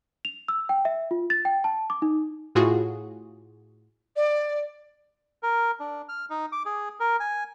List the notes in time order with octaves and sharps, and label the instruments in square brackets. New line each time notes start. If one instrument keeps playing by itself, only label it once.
[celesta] F7
E6
G5
E5
F4
A6
G5
A5
D6
D#4
[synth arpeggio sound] A2 F4 F#4 G#4
[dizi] D5
[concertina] A#4
D4
F6
D#4
D6
G#4
A#4
G#5